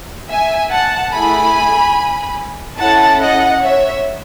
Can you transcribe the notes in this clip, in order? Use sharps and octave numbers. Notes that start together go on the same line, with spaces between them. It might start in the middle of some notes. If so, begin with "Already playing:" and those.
E5 G#5
F#5 A5
A3 E4 G#4 G#5 B5
C#4 E4 A4 F#5 A5
D#5 F#5
C#5 E5